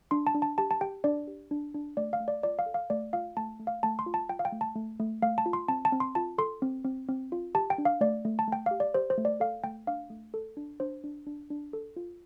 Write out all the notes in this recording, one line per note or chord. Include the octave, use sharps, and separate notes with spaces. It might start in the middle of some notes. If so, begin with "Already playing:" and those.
D4 C6
A5
D4
A5
G4 A5
A5
G4 G5
D4 D5
G4
D4
D4
A3 D5
F5
A3
D5
F4 D5
F5
A4
F5
A3 D5
F4 F5
A3 A5
A3
F5
A3 A5
C6
F4
A5
F4 G5
F5
G5
A3
A5
A3
A3
A3 F5
A5
F4
C6
C4 A5
A5
C4
C6
F4 A5
A4 C6
C4
C4
C4
F4
G4 A5
G5
D4
F5
A3 D5
A3
A5
A3 G5
G4 F5
D5
G4 C5
C5
A3
D5
A4 F5
A3 G5
D4 F5
A3
A4
D4
D4 C5
D4
D4
D4
A4
F4